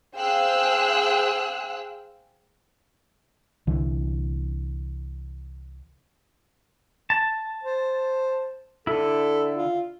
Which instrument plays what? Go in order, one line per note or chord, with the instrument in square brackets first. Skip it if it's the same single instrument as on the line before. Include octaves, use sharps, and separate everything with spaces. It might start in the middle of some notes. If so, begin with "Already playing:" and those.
[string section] G#4 C5 F5 G5 E6 F#6
[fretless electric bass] C2 D3 E3
[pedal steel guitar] A5
[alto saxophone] C5
[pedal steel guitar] D3 E4 [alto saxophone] A4
[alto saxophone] F4